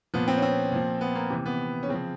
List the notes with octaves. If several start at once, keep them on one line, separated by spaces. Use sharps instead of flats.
A#2 F3 B3
C4
C#4
C4
A#2 F3
B3
A#3
C3 E3
B3
C#4
C#3 F3 C4